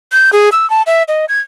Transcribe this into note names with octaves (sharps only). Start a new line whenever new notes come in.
G6
G#4
E6
A5
E5
D#5
G#6